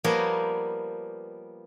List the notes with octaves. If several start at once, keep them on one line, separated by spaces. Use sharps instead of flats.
F3 G3 A#3 B3 A#4 C#5